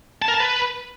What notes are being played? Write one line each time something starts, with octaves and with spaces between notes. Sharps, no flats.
A5
A#4
A5
B4